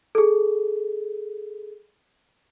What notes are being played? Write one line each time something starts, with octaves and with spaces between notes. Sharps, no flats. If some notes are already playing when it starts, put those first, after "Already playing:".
G#4 A4